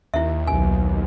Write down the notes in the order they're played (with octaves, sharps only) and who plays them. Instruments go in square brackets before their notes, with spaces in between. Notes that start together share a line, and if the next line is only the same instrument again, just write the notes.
[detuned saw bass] D#2 [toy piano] E4 E5
[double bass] B1 [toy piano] G#5